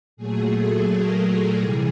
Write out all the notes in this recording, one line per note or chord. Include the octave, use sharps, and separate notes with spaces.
A#2 F#3 A3 G#4
A4
A#4
C3 E3 G3 G#4